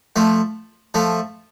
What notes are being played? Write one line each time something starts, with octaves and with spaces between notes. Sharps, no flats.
F3 A3
F3 A3